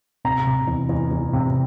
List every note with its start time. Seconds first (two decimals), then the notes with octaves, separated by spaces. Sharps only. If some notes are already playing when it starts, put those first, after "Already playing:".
0.25 C3 A#5
0.47 C3
0.67 E2
0.89 E2
1.11 E2
1.33 C3